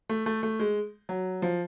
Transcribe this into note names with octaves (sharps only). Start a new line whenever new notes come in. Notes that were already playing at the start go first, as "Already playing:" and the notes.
A3
A3
A3
G#3
F#3
F3